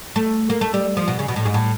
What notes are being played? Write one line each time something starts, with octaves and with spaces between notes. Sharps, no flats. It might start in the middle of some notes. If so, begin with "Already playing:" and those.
A3
A#3
A3
G3
F3
B2
C#3
B2
A2
G#2
A2